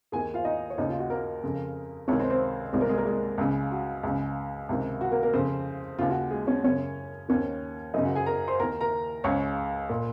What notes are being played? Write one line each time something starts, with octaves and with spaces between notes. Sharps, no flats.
D#2 D#3 G#4 G#5
F4 F5
D#4 D#5
C#5
D#2 C#3 D#4 D#5
F4
F#4
A#3 A#4
F2 C#3
C#2 C3 D#3 C#4 C#5
C4 C5
C4 C5
C2 C3 D#3 G#3 G#4
A#3 A#4
G#3 G#4
A#3 A#4
G#3 G#4
C#2 C#3
F#4
C#2 C#3
C#2 C3 D#3
F#4
A#3 A#4
A#3 A#4
F2 C#3 C4 C5
D#2 C#3 F4
F#4
G#3 G#4
C#4 C#5
F#2 C#3 C#4 C#5
D#2 D#3 C#4 C#5
F#2 C#3 D#4 D#5
F#4 F#5
G#4 G#5
A#4 A#5
C5 C6
D#2 D#3 A#4 A#5
A#4 A#5
C#2 C#3 C#5 C#6
A#2